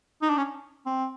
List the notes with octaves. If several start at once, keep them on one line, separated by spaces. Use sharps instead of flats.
D#4
D4
C#4
C4